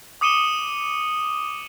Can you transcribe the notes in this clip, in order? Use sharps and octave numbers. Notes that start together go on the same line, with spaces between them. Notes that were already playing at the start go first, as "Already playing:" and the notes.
D6 D#6 C#7 D#7 E7 G7